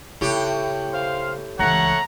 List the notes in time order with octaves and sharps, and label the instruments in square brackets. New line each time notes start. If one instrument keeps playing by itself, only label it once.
[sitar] A2 G4 [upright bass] C#3
[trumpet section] C5 F5
[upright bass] C#2 E3 [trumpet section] A3 C#5 F#5 [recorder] A#5